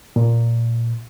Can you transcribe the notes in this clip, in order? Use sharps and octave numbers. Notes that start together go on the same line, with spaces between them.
A#2